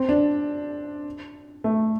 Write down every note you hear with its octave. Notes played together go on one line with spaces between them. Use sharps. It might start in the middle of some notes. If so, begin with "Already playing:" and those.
Already playing: C4
D4
A3